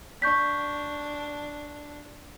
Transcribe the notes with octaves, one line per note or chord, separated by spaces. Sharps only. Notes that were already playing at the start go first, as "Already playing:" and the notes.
D4 C#6 G6 B6